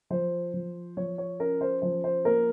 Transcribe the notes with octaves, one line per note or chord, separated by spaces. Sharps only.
F3 C5
F3
F3 C#5
C#5
C#4 A#4
C5
F3 C5
C5
A#3 A#4